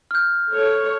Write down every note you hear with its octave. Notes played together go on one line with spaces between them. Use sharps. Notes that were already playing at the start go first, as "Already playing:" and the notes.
F6 G6
A4 C#5